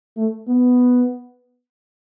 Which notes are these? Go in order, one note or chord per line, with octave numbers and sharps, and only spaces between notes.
A3
B3